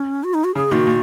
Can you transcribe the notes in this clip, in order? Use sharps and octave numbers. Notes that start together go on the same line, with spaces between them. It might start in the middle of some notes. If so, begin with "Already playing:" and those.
Already playing: C#4
F#4
D#4
F#4
C#3 G#4
A#2 D#3 F#4
A#2